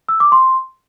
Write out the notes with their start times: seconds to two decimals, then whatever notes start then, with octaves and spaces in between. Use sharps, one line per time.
0.09 E6
0.20 D6
0.32 C6